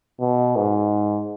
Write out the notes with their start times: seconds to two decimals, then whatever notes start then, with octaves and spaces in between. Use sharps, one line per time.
0.20 B2
0.56 G#2